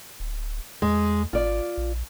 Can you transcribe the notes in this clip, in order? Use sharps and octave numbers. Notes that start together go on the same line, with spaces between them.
D1
E2 G#3
G#1 F4 D5
A#1